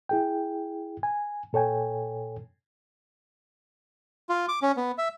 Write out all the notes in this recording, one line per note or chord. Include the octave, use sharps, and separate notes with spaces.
E4 G#4 G5
G#5
A#2 A4 C#5 G5 G#5
F4
D6
C#4
B3
E5